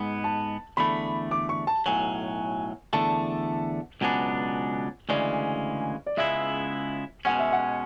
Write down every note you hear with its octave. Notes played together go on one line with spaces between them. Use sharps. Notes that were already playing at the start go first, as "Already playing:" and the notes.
Already playing: G#2 G#3 B3
A5
E2 D3 A3 B5
D6
C#6
A5
B1 A2 F#3 G#5
E2 D3 A3 A5
C#2 B2 F#3 B3 D4 G#5
D2 C#3 E3 G#3 C#4 D5
D5
C#2 C#3 G#3 B3 E4 E5
B2 G#3 C#4 F#5
E5
F#5